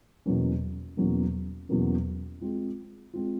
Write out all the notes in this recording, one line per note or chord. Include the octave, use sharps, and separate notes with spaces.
E2 B2 F#3 A#3 C#4
E2 B2 F#3 A#3 C#4
E2 B2 F#3 A#3 C#4
G#3 C4 F4
G#3 C4 F4